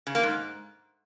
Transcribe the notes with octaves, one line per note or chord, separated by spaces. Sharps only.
C#3
A#3
G#2